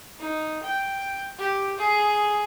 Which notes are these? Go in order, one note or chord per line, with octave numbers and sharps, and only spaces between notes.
D#4
G5
G4
G#4